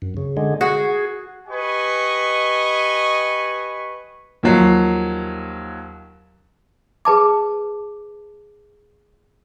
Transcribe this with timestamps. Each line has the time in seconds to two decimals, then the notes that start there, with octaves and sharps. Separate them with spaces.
0.02 F#2
0.17 C#3
0.37 D3 G#3
0.61 F#4 G#4
1.48 G4 B4 D#5 G#5 C#6
4.43 D#2 F3 F#3 C7
7.05 G#4 B4 A5 D6